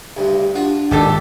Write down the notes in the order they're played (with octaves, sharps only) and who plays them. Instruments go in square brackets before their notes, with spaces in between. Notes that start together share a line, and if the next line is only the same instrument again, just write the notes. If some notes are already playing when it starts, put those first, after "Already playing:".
[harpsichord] D2 G2
[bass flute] D4 [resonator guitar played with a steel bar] F4 [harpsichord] F#4
[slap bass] G#1 [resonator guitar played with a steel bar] A#2 G4 A4 [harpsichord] D#3